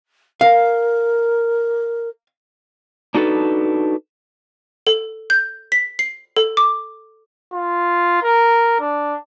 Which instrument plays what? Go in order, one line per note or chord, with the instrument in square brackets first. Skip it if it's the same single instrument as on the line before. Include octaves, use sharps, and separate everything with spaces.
[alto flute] A#4 [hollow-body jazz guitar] F5
[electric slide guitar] D4 D#4 F#4 A4 B4
[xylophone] A4
G6
B6
C7
A4
D6
[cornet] F4
A#4
D4